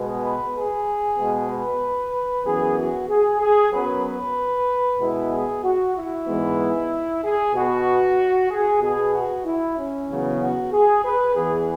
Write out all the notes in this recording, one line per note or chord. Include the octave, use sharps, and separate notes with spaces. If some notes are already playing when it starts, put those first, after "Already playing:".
Already playing: B2 G#3 B3
B4
G#4
B2 G#3 B3
B4
F#2 E3 B3 G#4
F#4
G#4
G#4
F#2 F#3 B3 B4
B4
B2 G#3 B3 E4
G#4
F#4
E4
G#2 E3 G#3 B3
G#4
B2 B3 F#4
G#4
B2 B3 G#4
F#4
E4
C#4
E2 C#3 F#3 B3
F#4
G#4
B4
E2 E3 B3 G#4